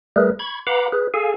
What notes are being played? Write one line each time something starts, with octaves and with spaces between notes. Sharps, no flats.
G3 A3 G#4 A#4 B4
B5 C#6 G#6
B4 F5 F#5 A#5 B5 D6
G#4 B4
G#4 A4 F5 G#5